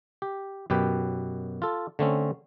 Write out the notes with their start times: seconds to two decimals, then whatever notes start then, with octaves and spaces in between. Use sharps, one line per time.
0.22 G4
0.70 F#2 B2 G4 B4 G5
1.62 F4 A4
1.99 D3 A3 C4 C#4